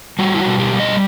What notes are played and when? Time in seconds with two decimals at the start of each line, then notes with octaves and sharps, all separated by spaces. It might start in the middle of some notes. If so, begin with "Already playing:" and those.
0.19 G3 F#4
0.34 E4
0.39 F#4
0.46 B2
0.59 G4
0.73 G3
0.80 D#5